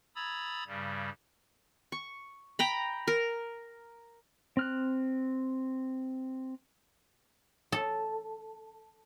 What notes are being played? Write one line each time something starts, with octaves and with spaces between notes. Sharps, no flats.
A#5 B5 D#6 E6 G#6 A6
G2 C#3 G3
C#6
G5 A#5 B5
A#4
C4 F6 F#6
A4